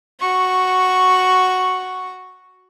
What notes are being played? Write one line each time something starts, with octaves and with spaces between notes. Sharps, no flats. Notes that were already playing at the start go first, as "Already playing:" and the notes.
F#4 C#6